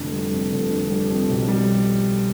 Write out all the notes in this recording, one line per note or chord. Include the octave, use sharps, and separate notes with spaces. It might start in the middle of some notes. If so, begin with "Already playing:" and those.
Already playing: F1 D3
G3
F2
F1
D3
G3
F2
B1
G3